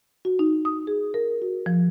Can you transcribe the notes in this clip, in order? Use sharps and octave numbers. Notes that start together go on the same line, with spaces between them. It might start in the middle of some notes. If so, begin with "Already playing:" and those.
F#4
D#4
D#6
G#4
A#4
F#4
F3